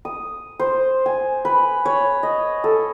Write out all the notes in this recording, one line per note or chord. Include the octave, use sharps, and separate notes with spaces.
D#6
C5
G#5
B4
C#5
D#5
A4